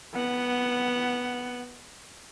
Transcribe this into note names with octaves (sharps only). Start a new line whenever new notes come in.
B3 F#5